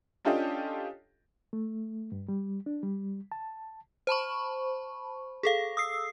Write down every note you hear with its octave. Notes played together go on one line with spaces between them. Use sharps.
C#4 D4 F4 G4 A4 D#5
A3
G2
G3
D4
G3
A5
C5 A5 B5 C#6
G#4 A4 F5
D#6 E6 C7